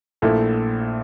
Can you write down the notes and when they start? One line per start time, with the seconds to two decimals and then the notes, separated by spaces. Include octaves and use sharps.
0.22 A#1 A#2 A3 E4 A4